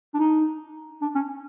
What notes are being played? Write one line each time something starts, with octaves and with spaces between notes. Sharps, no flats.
D4
D#4
D4
C#4